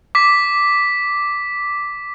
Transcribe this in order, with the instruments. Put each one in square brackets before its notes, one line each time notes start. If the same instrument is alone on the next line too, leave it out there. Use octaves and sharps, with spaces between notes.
[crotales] D6 B6